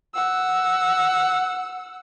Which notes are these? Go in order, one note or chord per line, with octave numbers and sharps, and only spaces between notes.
F#5 E6